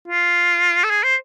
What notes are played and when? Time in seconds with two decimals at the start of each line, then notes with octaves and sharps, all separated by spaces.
0.08 F4
0.84 A4
0.90 G#4
1.03 C5